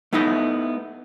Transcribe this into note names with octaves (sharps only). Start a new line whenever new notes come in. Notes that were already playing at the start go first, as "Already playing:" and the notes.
A3 B3 D#4 E4 D#5